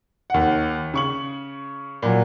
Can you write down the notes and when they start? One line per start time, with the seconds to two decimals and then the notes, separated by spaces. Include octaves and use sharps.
0.30 D#2 F#5
0.94 C#3 C#6 F#7
2.03 A#2 F#3